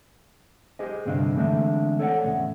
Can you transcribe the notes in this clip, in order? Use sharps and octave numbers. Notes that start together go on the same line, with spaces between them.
G4 G#4 C5 D#5
D2 G2 C3 C4 D4 F5
D3 E3 G#3 A3 C4 D4
A4 C#5 D5 E5 F#5
E2 A2 C#3